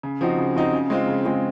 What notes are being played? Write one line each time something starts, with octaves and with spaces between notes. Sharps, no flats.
C#3
F3 C4 D#4 F#4
C#3
F3 C4 D#4 F#4
C#3
G#3 C4 F4
C#3
G#3 C4 F4